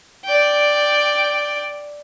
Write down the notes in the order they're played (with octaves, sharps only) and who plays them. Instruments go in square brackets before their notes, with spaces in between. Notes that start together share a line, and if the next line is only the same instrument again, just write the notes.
[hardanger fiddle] D5 G5